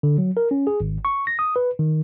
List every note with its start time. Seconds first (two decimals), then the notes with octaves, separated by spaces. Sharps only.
0.03 D3
0.18 F#3
0.37 A#4
0.51 C#4
0.67 G#4
0.80 G#1
1.05 C#6
1.27 A#6
1.39 D#6
1.56 B4
1.79 D#3